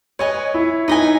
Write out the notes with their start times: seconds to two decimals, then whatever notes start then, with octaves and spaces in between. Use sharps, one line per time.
0.19 B4 C#5 D#5 G#5
0.54 E4
0.88 D#4 B4 D#5 G#5